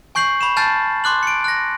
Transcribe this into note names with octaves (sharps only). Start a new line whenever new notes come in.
G#5 C#6 G6 C7 F#7
B5 C#6 E7
G#5 A5 F6 G6 A6 C7
C6 D6 F#6 F#7
C#7 D7
F#6 A#6